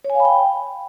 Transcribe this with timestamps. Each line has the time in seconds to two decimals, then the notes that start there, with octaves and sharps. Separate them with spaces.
0.05 C#5
0.10 G#5
0.15 F5
0.20 B5
0.25 G5